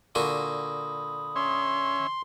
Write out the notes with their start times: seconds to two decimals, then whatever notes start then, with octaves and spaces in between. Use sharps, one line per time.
0.15 A#2 D3 F#4 B5 D#6
1.36 C#4 C#5 E5 C6